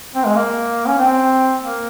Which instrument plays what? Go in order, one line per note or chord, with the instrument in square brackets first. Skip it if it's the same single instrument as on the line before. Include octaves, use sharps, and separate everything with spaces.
[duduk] C4
G#3
A#3
C#4
C4
A#3